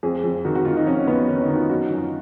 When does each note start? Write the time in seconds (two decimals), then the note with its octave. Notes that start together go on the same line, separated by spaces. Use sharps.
0.03 F2 G#4
0.24 F2
0.45 D#3 F#4
0.55 F#4
0.65 D#3 F4
0.76 D#4
0.86 F2 C#4
1.07 F2 B3
1.28 D#3 C#4
1.41 D#4
1.48 D#3
1.56 F4
1.69 F#2 F#4
1.84 D#4
1.90 F#2
1.97 F4